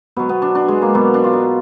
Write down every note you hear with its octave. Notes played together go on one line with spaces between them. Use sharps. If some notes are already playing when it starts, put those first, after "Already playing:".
B2 F#3 B3
B3
D4
D4
G#3
A#3
B2 F#3 B3
D4
F4
D#4